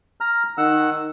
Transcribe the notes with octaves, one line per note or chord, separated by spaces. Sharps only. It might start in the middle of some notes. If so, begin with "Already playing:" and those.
A#5 F6
D#3 F#5 E6